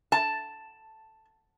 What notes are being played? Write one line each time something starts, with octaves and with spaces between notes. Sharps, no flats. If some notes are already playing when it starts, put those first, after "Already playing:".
A5